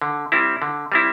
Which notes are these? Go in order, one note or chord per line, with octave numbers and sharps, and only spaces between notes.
D3
G3 C4 E4
D3
G3 C4 E4